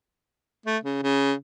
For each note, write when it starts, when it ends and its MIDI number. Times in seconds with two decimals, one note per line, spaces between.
0.66 0.77 57
0.84 0.99 49
1.03 1.33 49